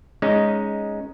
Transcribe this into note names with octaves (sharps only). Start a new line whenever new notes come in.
G#3 C#4 D#4